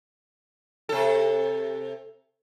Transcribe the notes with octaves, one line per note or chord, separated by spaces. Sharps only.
C3 A4